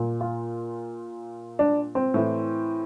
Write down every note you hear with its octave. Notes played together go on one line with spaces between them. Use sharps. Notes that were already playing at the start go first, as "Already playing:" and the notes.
Already playing: A#2
F4
D4
C4
A2 E3